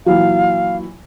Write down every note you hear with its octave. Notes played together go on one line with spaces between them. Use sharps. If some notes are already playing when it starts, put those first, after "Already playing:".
A#2 E3 F#3 F5